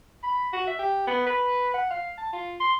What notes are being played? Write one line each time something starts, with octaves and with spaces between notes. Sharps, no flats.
B5
F#4
E5
G4
B3
B4
F#5
F5
A5
F4
C6